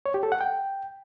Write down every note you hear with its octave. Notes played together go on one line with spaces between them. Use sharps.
C#5
G4
A4
F#5
G5